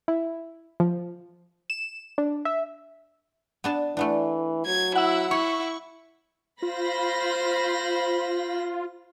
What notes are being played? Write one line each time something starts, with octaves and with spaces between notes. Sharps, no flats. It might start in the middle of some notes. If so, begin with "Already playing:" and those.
E4
F3
E7
D4
E5
B3 D4 A5
E3 A3 B3 D4
F#3 G#6
E4 F#5 E6
E4 C#5 C#6
F4 C5 B5 A#6